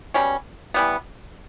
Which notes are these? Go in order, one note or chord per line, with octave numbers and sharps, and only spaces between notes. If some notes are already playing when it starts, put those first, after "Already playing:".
B2 G3 C#4
E3 G3 B3